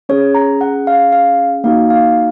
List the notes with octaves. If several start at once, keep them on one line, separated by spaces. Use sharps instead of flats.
C#4 G#4 C#5
A#5
F#5
F5
F5
A#3 D#4 F#4 F5
F5